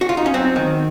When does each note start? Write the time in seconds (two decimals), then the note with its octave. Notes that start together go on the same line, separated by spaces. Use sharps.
0.01 F#4
0.09 F4
0.17 D#4
0.26 C#4
0.34 F#3 C4
0.56 D#3